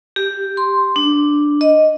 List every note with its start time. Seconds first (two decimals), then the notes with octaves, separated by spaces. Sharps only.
0.16 G4
0.57 C6
0.96 D4
1.61 D#5